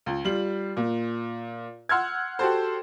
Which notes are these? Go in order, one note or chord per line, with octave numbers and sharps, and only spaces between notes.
C#2
G3 F4 F#7
A#2
F#5 C6 E6 F6 G#6
F#4 G4 A4 C5